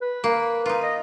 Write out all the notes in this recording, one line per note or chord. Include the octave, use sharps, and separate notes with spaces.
B4
A#3
D#4 F4
D#5